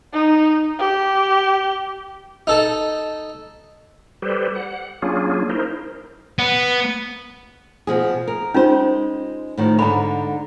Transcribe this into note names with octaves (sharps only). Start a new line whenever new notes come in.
D#4
G4
D#4 A4 A5
G3 G4 A4 B4 C5
F#5
F#3 A#3 C#4 D4 F4 G#4
D#4 E4 A#4 C5
B3
B2 F3 G#4
A#4
G#3 C#4 D#4 F4 C5
A2 D#3 F3
G#2 D3 A#5 B5